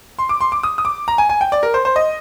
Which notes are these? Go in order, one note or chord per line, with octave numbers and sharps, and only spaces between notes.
C6
D6
C6
D6
D#6
D#6
D6
A#5
G#5
G#5
G5
D5
A#4
C5
C5
D#5